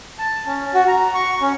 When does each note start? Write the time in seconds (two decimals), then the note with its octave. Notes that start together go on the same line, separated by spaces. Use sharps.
0.19 A5
0.47 C#4
0.74 F#4
0.87 A#5
1.14 C#6
1.41 C#4